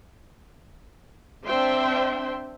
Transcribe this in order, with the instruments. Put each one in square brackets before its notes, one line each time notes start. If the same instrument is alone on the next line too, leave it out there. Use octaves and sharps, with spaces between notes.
[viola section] C4 D4 C5 E5 G5 C6